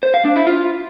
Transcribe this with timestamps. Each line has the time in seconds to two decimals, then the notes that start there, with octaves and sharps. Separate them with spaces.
0.03 C5
0.14 F5
0.25 D4
0.36 E4
0.47 F4